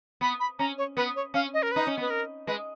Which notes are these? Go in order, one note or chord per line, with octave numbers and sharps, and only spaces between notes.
B3 B5
B5
C#4 A#5
C#5
B3 B4
C#5
C#4 F5
D#5
A#4
D#4 B4
C#4
B3
B4
A#4
G#3 B4